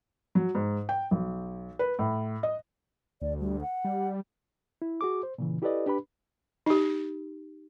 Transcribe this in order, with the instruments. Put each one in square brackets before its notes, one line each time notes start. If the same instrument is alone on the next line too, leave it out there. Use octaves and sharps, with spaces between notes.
[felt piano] F#3
G#2
G5
B1
B4
A2
D#5
[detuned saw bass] D2 [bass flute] D5
[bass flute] G3
F#5
[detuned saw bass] G3
[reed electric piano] E4
F#4 G#4 D6
C5
A#2 C#3 E3
E4 G4 A4 B4 D5 D#5
D4 G4 B4 B5
[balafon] D#4 G4